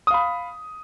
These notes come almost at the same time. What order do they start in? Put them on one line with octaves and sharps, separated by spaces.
D#6 F5 B5